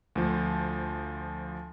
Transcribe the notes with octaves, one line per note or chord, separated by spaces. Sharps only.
D2 F3